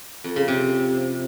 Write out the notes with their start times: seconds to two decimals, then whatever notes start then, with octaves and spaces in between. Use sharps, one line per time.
0.24 F2
0.36 C#3
0.48 C3